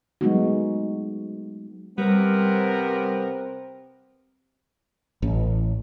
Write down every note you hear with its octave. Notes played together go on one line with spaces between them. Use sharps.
F#3 G#3 A3 B3 D#4 F#4
C3 G3 B3 C4 A#4
A1